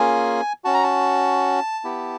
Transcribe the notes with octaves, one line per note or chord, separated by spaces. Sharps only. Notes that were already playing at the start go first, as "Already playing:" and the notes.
Already playing: A#3 C#4 F4 G#4 G#5
C#4 F#4 A5
A#5
A5
B3 E4 G4